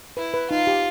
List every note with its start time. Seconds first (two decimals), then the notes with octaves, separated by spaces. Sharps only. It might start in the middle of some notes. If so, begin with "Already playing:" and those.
0.17 E4 B4
0.34 B4
0.50 D#4 F4
0.67 G4